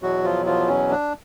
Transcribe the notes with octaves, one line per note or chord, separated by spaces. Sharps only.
E2 B2 F#3 F#4
F3 F4
F3 F4
C#4
D4